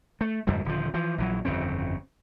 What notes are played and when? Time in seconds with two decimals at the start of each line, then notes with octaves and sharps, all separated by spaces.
0.21 A3
0.47 F2 G#2 D3 G3
0.65 D#1 D3 F3
0.94 E3 F3
1.18 A#1 E3 F#3
1.45 G1 F2 C#3 C4